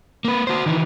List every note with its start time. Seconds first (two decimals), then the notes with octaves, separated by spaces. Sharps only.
0.25 A#3 B4
0.47 F#4 C5
0.66 D#3 E3